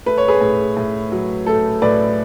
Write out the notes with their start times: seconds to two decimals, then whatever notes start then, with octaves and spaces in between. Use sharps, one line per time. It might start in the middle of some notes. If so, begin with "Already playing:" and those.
0.06 A3 B4
0.18 C#5
0.28 G#4 B4
0.41 A2
0.77 A2
1.12 F#3
1.46 A3 A4
1.82 A2 B4 D5